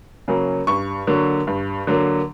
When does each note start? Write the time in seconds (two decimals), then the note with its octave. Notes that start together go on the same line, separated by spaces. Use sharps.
0.28 C#3 F#3 A#3 C#4
0.67 G2 C#6
1.07 D3 F#3 A#3
1.47 G2
1.87 D3 F#3 A#3